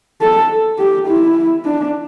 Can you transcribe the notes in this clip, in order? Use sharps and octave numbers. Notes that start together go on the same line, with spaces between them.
A4
G4
E4
D4